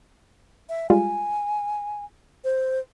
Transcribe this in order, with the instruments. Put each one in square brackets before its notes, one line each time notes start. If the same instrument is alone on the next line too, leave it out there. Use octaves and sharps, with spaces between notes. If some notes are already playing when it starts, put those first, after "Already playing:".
[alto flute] E5
[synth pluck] G3 G#3 F4 [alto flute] G#5
[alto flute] C5